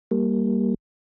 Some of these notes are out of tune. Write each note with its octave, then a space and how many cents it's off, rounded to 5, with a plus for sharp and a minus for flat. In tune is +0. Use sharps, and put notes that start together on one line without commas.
G3 +0 A#3 +0